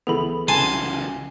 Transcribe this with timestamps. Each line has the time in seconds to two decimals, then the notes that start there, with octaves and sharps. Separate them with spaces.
0.07 C#2 E3 B3 G#4 A4 B5
0.48 C2 C#3 E3 F#3 G#5 A5 C6